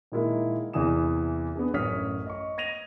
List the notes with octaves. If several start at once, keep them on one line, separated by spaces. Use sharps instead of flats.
A#2 D#3 G#3 A#3 E4
E2 C3 E3 G#5 D#6 E7
B3 D4 G#4
A1 F#2 C#5 D#6 F6 B6
D#5 C#6
G#6 A#6 D#7 F7